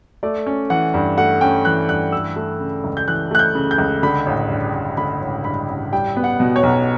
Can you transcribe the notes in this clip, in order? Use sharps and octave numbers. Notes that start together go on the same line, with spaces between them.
A3 D5
C#4
E3 F#5
G2
A3 F#5
C#4 G5
E3 F#6
G2 F#6
E3 E6
A3
C#3
C#2
G6
E3 F#6
A3 F#6
G6
C#3
G6
C#2
D3 B5
A1
G2
A1
D3 B5
A1
G2 B5
A1
G3 G5
B3
F#5
B2
C#5
B1